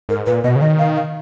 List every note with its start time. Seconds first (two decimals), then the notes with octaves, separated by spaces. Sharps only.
0.09 G#2 A#4
0.26 A#2 B4
0.44 B2 D#5
0.56 C#3
0.61 D#3 D#5
0.79 F5
0.96 F5